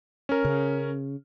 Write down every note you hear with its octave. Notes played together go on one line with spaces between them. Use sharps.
C#4 A#4
C#3